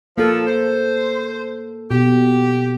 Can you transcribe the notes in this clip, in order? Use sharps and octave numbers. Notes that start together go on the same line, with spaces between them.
F3 A#3 A4
C5
B2 G4